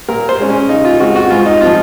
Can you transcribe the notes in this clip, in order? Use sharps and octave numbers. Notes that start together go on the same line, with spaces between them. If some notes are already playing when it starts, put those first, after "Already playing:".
A#2 A#4
C5
G#3 C#4
C#4
C#3 D#4
F4
G#3 C4 F#4
F#4
G#2 F4
D#4
F3 C4 F4